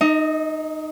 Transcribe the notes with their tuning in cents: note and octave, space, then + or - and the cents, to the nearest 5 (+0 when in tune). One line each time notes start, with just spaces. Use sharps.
D#4 -15 D#5 +30